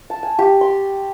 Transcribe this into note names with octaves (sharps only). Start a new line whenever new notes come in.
A5
G#5
G4
C6